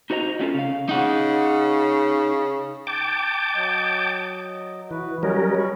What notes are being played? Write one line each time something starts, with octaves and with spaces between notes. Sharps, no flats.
D#4 F#4 C5 D#5 A#5
F#3 A3 C#4 F4 A4
C#3 F5
C#3 D#4 F#5
G5 A5 D6
F#3 D#5
E3 F#4 B4
F#3 G3 C#4 A#4 C#5 D#5
B5 C#6